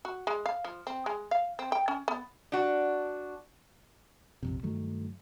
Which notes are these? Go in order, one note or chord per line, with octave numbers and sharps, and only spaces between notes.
F#4
G#3
F5
F3
C4
G#3
F5
C4
G5
C#4
B3
D4 F#4
A#1 F2 C3
G2 D#3 F#3 A3